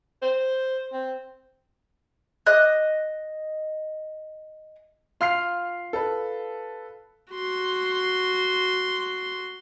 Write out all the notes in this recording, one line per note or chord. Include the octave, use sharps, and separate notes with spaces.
C5
C4
D#5 F#6
F4 F5 C6 F6 C7
A4 B4
F#4 C6